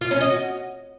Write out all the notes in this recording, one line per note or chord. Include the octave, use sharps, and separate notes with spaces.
F4
C#4
D#5
F#4